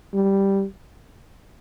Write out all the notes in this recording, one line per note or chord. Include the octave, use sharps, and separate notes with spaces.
G3